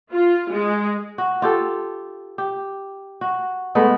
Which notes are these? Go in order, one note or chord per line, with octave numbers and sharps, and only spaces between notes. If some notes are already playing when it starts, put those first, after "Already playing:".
F4
G#3
F#4
F4 G4 A4
G4
F#4
G#3 A3 B3